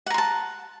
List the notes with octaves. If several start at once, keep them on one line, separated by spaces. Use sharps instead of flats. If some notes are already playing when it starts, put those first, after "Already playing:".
F#5 A5 A#5 C6